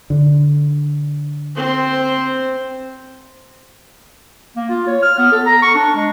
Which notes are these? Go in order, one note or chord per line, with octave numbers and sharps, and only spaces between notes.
D3
C4 C5
A#3
F4
C#5
F6
B3
A4
A#5
C#6
D4
G#3